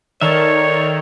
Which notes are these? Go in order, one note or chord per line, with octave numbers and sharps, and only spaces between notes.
D#3 A4 A#4 C#5 D5 E5